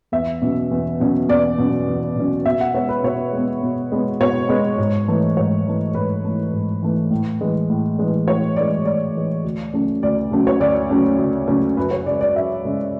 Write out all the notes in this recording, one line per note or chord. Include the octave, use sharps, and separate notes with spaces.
E2 E5
B2 F#3 C#4
E2
B2 F#3 C#4
E2 D5
B2 F#3 C#4
E2
B2 F#3 C#4
B2 E5
F#5
G#3 B3 C#5
B4
B2 C#5
G#3
B3
B2
G#3 B3
B2 C#5
G#3 B3
G#2
E3 A3
G#2 C#5
E3 A3
G#2 B4
E3 A3
G#2
E3 A3
A2
E3 G#3
A2
E3 G#3
A2 C#5
E3 G#3 D5
A2 D5
E3 G#3
D2
C#3 F#3 A3 C#4
D2 D5
C#3 F#3 A3 C#4
C#5
D2 D5
C#3 F#3 A3 C#4
D2
C#3 F#3 A3 C#4
F#2 B4
C#5
C#3 G#3 D5
D5
F#2 E5
C#3 G#3